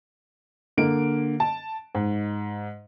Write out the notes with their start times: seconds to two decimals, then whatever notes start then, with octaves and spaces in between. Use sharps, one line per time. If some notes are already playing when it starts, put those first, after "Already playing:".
0.78 D3 A#3 D7
1.40 A5
1.95 G#2